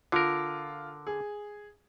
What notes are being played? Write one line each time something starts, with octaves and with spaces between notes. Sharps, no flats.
D3 F4 A#4
G#4